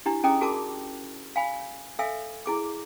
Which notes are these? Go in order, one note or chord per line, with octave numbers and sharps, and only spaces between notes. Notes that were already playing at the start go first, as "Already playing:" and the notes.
D4 E4 G4
C#4 G#4 D#5 G5 A#5 D#6
F#4 G#4 A#4 A5 D6
F5 G#5 B5
A4 E5 F5 G#5 E6
E4 G#4 D6